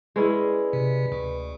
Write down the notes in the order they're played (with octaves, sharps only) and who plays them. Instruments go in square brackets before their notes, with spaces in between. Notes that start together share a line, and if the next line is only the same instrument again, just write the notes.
[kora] G#3 C#4 E4 [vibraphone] B4 D5 B5
[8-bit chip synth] C3
D2